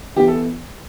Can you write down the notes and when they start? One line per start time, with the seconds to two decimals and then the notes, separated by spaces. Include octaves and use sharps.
0.16 E3 B3 G4
0.28 A4